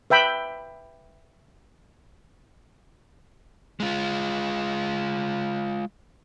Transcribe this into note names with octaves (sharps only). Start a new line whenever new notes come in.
B4 E5 G5 B5
G#3 F4